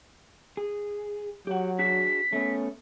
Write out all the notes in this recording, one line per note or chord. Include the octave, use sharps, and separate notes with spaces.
G#4
F#3 G4 F#5
D4 F#4 G#4 B6
A3 B3 C#4